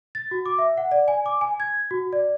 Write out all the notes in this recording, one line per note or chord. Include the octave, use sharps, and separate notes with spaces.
A6
F#4
D6
E5
F#5
D5
G#5
D6
G#5
G#6
F#4
D5